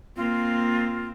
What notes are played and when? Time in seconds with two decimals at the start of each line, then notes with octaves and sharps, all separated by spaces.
0.16 A#3 C4 F4